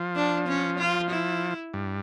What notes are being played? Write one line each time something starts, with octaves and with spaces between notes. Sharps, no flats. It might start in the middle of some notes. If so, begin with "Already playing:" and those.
Already playing: F3
D4
C#4
F4
E4
G2